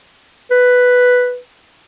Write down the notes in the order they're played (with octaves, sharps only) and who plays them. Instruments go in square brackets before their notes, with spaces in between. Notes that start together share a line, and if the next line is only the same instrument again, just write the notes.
[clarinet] B4